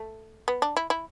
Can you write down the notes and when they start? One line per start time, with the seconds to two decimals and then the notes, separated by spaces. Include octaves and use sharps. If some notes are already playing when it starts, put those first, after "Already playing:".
Already playing: A3
0.48 B3
0.62 D4
0.76 E4
0.90 E4